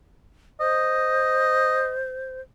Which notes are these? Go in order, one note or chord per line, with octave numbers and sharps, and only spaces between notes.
C5 D#5